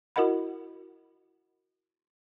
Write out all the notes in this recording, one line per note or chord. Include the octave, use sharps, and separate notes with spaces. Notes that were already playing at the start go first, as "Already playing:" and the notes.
E4 F#4 A#4 D#5 F#5 B5